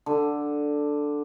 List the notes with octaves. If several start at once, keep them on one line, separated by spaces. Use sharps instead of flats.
D3